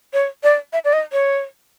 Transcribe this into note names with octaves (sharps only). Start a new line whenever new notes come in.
C#5
D5
E5
D5
D#5
C#5